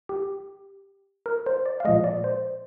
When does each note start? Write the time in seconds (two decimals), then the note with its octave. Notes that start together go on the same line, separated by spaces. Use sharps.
0.09 G4
1.26 A#4
1.46 C5
1.66 D5
1.80 F5
1.85 A#2 F3 G#3 D#5
2.04 D5
2.24 C5